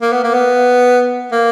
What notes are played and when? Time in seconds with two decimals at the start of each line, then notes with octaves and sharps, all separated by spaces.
0.02 A#3
0.13 B3
0.24 A#3
0.34 B3
1.32 A#3